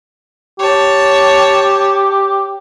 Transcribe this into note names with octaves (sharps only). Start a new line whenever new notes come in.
G4 C#5 A5